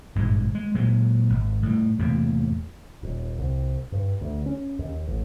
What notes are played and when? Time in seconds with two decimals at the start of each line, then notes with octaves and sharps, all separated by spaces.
0.15 G#1 G2 A#2 G#3
0.55 G#3
0.75 A#2 F#3 G#3
1.30 G#1
1.63 A2 G3
1.99 E2 A2 C3 A#3
3.03 D#1
3.39 C2
3.92 G2
4.21 D2
4.46 C#4
4.79 D#2
5.07 A1